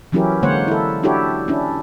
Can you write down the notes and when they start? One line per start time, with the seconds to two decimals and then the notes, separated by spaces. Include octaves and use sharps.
0.12 E3 F#3 C#4 E4 G4 A#4
0.43 D3 G#3 A#3 C5 C#5 F#5
0.68 E4 A4
1.03 D4 E4 F#4 G4 A4 C#5
1.48 C#4 D4 E4